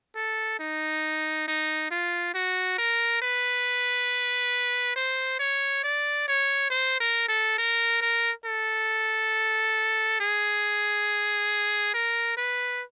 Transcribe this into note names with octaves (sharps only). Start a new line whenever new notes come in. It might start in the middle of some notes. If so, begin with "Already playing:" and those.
A4
D#4
D#4
F4
F#4
A#4
B4
C5
C#5
D5
C#5
C5
A#4
A4
A#4
A#4
A4
G#4
A#4
B4